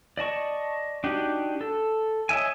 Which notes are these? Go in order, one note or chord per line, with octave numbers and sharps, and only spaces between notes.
D5 D#5 A5 C#6
D4 D#4 F#4 G4
A4
C#5 D#5 E5 G#5